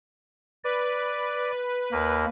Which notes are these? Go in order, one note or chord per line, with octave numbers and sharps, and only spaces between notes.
B4 D5
D#2 A#3